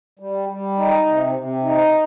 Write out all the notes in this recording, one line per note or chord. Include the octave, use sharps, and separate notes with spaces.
G3
G3
D#4
C3
C3
D#4